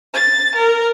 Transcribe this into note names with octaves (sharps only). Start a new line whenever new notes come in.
A6
A#4